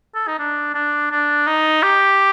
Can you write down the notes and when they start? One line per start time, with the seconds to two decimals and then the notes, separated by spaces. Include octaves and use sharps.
0.15 A4
0.27 D#4
0.39 D4
0.74 D4
1.11 D4
1.47 D#4
1.83 G4